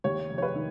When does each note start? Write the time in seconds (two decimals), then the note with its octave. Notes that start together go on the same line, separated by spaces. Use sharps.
0.04 D#2 C#5
0.30 F1
0.38 C#5
0.42 B4
0.55 D#3